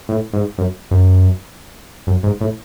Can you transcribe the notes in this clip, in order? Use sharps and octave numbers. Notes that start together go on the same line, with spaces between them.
A2
G#2
F#2
F#2
F#2
G#2
A2